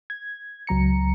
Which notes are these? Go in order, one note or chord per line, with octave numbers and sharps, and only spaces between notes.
G#6
C#2 F#3 A#5 C#7